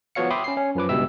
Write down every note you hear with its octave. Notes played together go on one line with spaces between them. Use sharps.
F3 B3 F#4 C#5 F5 C#7
E5 G5 B5 C6 D6 D#6
C#4 C7
C#4
F#2 F3 B4 D6
C#2 G2 B2 G4 E5 E6